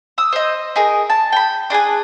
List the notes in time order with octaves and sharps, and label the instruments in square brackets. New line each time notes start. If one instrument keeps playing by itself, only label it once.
[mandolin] D#6 E6
C5 D#5
D#4 G#4 A#4
A5
G5 B5
D4 G#4 B4 G#5